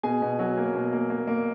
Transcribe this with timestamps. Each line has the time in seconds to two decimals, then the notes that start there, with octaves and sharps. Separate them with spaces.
0.03 B2 G#4 G#5
0.22 B2
0.39 F#3
0.57 A#3
0.75 B2
0.93 A#3
1.10 A#3
1.27 A#3